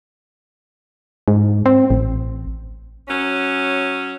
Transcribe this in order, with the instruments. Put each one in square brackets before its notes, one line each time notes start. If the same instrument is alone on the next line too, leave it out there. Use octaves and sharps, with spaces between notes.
[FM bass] G#2
C4
A1
[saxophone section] F#3 C#4